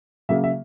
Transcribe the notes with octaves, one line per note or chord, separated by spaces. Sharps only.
C#3 F#3 A#3 E5
E5